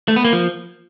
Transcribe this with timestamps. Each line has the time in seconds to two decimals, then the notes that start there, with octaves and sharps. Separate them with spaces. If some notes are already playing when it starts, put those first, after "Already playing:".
0.08 A3
0.16 B3
0.25 A#3
0.33 F3